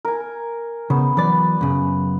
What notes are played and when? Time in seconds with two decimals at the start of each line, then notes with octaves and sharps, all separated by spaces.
0.05 A#4 G#5
0.90 C#3 B3 C5
1.17 E3 F#3 B4 D5
1.61 F#2 C#3